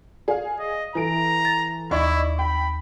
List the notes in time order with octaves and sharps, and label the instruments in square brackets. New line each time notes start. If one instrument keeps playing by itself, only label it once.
[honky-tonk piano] G#4 F5 [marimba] D5
[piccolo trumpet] D#5
[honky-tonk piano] E3 A4 D7 [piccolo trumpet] A#5
[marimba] A6
[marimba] D#2 [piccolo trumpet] E4 [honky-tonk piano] D5 D#5 C#6
[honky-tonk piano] G5 [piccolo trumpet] B5